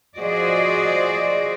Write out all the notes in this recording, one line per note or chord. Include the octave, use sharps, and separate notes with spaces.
F3 F#4 G#4 C5 D5 D#5